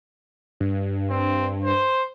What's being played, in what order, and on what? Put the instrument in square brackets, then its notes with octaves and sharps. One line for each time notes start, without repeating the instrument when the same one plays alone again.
[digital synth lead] G2
[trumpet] C4
C5